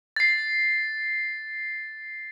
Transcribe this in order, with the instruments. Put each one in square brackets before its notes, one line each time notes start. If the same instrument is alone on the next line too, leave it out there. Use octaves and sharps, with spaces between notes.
[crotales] A6 C7